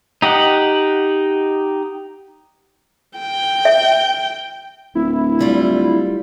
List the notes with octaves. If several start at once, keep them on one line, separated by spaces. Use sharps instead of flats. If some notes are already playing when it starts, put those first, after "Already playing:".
D#4 G4 D#5 F#5
G5
E5
D1 E4
D3 G3 F4